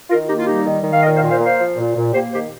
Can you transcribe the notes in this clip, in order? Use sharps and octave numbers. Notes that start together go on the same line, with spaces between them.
D#3 F4 A#4
A#3 D#4 G4
F4
G3 D#4 G4
D#3
D#3
F5
A#2 A#4 D#5
C5 F5
A#2
C5 F5
A#3 C5 F5
F3
A#2
A#2
A#3 G4 C5
D#3 G4 C5